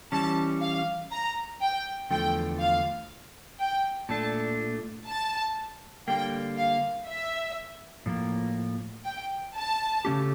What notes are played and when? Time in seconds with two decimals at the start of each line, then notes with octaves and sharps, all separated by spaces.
0.12 E3 G3 C#4 A5
0.61 F5
1.11 A#5
1.61 G5
2.10 E2 D3 F3 A3 G5
2.60 F5
3.60 G5
4.09 A#2 A3 D4 A5
5.08 A5
6.08 D3 G3 A#3 G5
6.57 F5
7.07 E5
8.06 A2 F3 A#3
9.05 G5
9.55 A5
10.05 C#3 F3 A3 C#4 G4